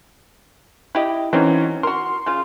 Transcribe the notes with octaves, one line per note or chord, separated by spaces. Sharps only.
E4 G4 D#5
D#3 E3 F#3 C4 C#4
F#4 A#4 C6
C#3 F4